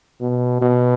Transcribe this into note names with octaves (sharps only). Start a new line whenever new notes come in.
B2
B2